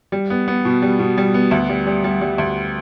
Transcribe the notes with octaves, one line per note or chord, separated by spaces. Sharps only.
G3
B3
B3
B2
G3
B2
G3
B3
D2
G3
G3
G3
G3
D2